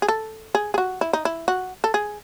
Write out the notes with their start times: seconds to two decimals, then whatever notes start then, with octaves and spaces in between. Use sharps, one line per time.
0.02 G#4
0.08 A4
0.55 G#4
0.74 G#4
0.78 F#4
1.01 E4
1.13 D#4
1.25 E4
1.48 F#4
1.84 A4
1.94 G#4